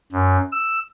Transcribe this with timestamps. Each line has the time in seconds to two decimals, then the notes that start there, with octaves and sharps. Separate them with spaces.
0.12 F#2
0.52 E6